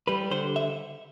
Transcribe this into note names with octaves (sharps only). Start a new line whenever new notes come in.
G3 B4
D3 C5
E5